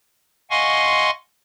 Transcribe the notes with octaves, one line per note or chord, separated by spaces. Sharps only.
D#5 F5 F#5 G#5 C6 C#6